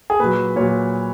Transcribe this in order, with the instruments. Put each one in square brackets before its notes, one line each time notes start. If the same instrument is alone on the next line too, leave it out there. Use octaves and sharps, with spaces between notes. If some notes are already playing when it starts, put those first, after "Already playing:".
[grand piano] G#4
A#2 F#3 B4
A#2 C#5
F#3